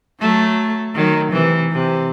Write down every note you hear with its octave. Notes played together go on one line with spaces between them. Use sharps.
F#3 A3
D#3 F#3
C3 E3
C3